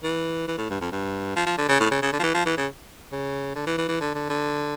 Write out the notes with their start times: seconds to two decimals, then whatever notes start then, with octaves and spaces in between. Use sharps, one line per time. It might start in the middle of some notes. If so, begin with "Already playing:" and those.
0.03 E3
0.48 E3
0.58 A2
0.70 G2
0.81 F2
0.92 G2
1.36 F3
1.46 F3
1.58 D3
1.69 C#3
1.80 A2
1.91 C#3
2.02 C#3
2.13 D3
2.19 F3
2.23 E3
2.35 F3
2.46 E3
2.57 C#3
3.12 C#3
3.56 D3
3.67 E3
3.78 E3
3.89 E3
4.01 D3
4.15 D3
4.29 D3